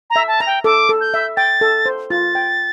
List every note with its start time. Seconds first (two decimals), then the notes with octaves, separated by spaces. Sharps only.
0.10 A#5
0.16 E5
0.27 A5
0.40 A#5
0.47 G5
0.64 A4 D6
0.89 A4
1.01 G6
1.14 E5
1.37 G5 A6
1.61 A4
1.86 C5
2.10 F4 A6
2.35 G5